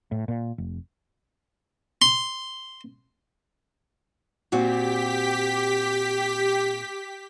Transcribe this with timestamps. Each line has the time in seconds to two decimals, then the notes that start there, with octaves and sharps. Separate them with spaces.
0.12 A2
0.28 A#2
0.58 F1
2.02 C6
4.52 A#2 C4 F#4 G4 B6